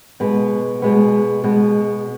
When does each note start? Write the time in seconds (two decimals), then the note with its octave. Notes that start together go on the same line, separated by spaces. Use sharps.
0.20 B2 G#3 B3
0.82 B2 G#3 B3
1.44 B2 G#3 B3